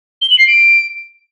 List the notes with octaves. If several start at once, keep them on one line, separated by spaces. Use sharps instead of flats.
G7
F#7
C7
D7